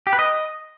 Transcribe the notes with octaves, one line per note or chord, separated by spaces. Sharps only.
G4
B4
D#5